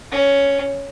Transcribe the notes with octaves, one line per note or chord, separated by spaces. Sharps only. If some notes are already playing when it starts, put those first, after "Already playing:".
C#4